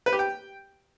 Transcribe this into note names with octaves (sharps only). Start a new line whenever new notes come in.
B4
G4
G5